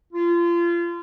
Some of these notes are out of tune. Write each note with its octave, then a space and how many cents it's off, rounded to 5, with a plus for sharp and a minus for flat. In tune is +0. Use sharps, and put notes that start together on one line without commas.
F4 -30